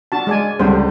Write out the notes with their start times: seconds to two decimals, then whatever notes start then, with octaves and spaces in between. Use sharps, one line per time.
0.12 D4 F#4 A5
0.27 G#3 D5 G#5
0.59 C#2 D3 G3 C5